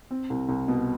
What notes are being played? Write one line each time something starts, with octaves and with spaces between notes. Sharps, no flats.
C4
C2
C2
B2